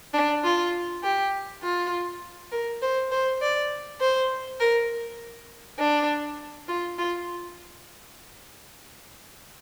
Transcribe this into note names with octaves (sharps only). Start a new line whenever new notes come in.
D4
F4
G4
F4
A#4
C5
C5
D5
C5
A#4
D4
F4
F4